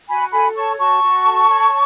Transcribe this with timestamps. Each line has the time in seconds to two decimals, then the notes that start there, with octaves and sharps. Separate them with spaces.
0.08 F#4 G#5 B5
0.32 A4 G#5 B5
0.55 C#5 A5 C#6
0.79 F#4 A5 C#6
1.03 F#4
1.26 A4
1.49 C#5